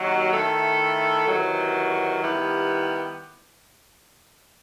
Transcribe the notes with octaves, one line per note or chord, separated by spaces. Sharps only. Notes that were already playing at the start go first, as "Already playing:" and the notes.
Already playing: D#2 D#3 F#3
D#3 A3 E4 A4
E2 C3 D#3 F#3
D#3 G3 B3 E4 G4